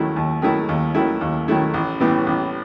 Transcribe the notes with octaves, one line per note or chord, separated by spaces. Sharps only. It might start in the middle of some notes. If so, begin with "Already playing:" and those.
Already playing: D#2 D#3 F#3 A3 E4
D#2
D#3 F#3 A3 E4
D#2
D#3 F#3 A3 E4
D#2
D#3 F#3 A3 E4
A1
A2 E3 G3 B3
A1